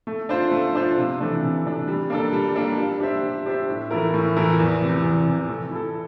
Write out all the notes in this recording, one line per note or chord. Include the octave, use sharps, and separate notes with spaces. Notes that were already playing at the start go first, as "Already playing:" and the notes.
A3
D4 F4 C5
A3
D4 F4 C5
C3
E3 A3 D4
C3
E3 A3 D4
G3
A#3 D4 A4
G3
A#3 D4 A4
G3
D4 G4 C5 E5
G3
D4 G4 C5 E5
A2
E3 A3 E4 A#4
A2
E3 A3 E4 A#4
E2
C3 E3
E2
C3 E3
A3
E4 A4